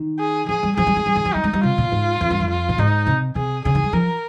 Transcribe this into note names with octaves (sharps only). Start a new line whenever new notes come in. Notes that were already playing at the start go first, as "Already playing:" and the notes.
Already playing: D#3
G#4
F3 G#4
G3
F3 G#4
G3
G#3
G3
D#3
F3
G3 D#4
G#3
G3
C3 F4
A#2
G#2
F2
G2
F2
F4
A#2
G#2 D#4
C3
C3 G#4
C#3 G#4
D#3
G3
F3 A#4